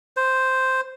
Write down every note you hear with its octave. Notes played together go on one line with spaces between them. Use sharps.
C5